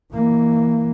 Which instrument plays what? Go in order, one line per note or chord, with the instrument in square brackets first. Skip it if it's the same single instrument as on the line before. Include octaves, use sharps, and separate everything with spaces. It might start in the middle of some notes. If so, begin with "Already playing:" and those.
[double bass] E3 A#3